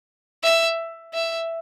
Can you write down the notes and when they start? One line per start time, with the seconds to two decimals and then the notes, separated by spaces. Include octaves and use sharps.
0.43 E5
1.14 E5